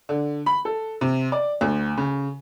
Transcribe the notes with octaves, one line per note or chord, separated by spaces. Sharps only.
D3
B5
A4
C3
D5
D2
C#3